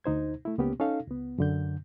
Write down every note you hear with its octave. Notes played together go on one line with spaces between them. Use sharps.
D2 D#4 C5 G#6
A3 E4
C#2 A#3 B3 C#4 G4
C#4 D#4 A4 F5
C#2 B3
F#2 D3 G6